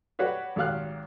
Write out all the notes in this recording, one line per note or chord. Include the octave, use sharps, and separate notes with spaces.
F#4 G4 B4 C#5 D5 F#5
G#1 F#3 G4 F5 F6 F#6